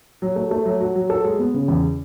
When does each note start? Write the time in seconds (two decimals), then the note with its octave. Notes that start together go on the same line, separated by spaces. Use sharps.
0.22 F#3
0.36 A3
0.51 A3
0.66 F#3
0.80 F#4
0.96 F#3
1.10 A4
1.24 G#3
1.39 B3
1.54 C#3
1.68 E2